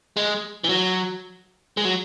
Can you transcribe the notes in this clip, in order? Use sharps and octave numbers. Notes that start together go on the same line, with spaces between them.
G#3
E3
F#3
G#3
F#3